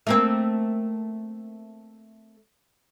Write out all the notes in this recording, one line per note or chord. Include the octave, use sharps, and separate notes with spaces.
A3 A#3 C4